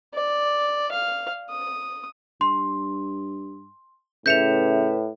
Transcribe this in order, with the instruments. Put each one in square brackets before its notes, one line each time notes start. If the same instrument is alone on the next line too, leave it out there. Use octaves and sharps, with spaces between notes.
[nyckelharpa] D5
F5
D#6
[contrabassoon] G2 [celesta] C6
[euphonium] A2 [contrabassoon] C#3 [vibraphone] B4 E5 [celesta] G6 C#7 F7